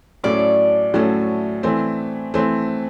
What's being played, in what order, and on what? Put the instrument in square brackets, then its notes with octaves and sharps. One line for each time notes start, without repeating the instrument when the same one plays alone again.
[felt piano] A2 F#3 A3 C#4 [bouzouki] D5
[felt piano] A2 F#3 A3 C#4
E3 A3 C4
E3 A3 C4